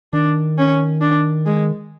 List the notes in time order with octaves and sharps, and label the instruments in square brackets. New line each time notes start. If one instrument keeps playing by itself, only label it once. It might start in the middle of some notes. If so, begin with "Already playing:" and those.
[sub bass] D#3 [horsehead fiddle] D4
[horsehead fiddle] C#4
D4
G#3